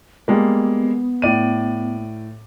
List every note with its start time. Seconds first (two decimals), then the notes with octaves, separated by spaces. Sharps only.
0.28 G3 G#3 A#3 B3
1.22 A2 D5 D#7